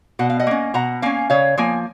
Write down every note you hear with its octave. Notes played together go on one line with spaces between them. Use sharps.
B2 F#5
F5
D#5 F#5
A#3 C#4
B2 F#5 A#5
A#3 C#4 F5 G#5
C#3 C#5 F5
F3 A#3 G#5